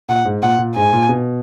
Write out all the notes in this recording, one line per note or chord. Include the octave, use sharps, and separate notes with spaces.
A#2 F#5
G#2
A#2 F#5
A#2
G#2 G#5
A#2
B2